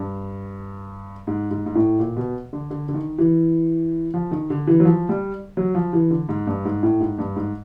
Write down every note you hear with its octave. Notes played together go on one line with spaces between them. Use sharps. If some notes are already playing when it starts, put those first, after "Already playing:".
Already playing: G2
G#2
G#2
G#2
A2
A#2
B2
D3
D3
D3
D#3
E3
F3
D#3
D3
E3
F#3
F3
G3
F#3
F3
E3
D3
G#2
G2
G#2
A2
G#2
G2
G#2